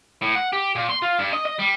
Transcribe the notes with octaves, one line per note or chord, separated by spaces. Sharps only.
A2
F#5
G4
A#2
C6
F4
G2
D#5
D#5
G3